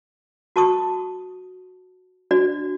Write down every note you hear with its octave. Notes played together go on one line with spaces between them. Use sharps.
F#4 A5 C#6 D#6
D4 F#4 D5